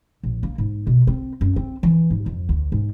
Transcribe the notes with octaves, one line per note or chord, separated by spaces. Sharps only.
A#1
A#3
G#2
B2
C4
F#2
C4
E3
G#2
F2
D2
G#2